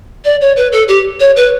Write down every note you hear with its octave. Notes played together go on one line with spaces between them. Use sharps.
D5
C#5
B4
A4
G4
C#5
B4